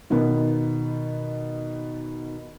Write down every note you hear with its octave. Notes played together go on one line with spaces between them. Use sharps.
B2 D#3 B3